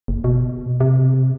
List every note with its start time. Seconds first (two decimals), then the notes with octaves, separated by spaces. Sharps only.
0.08 F#1
0.24 B2
0.80 C3